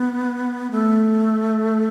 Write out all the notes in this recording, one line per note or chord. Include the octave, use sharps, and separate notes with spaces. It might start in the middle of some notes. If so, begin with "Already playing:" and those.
Already playing: B3
A3